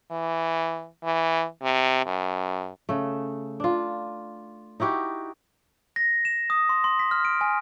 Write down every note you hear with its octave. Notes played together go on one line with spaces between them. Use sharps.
E3
E3
C3
F#2
C#3 A3
D4 F4
D#4 E4 F#4 G4
A#6
E7
D#6
C6
C6
B6
F6
D7
G#5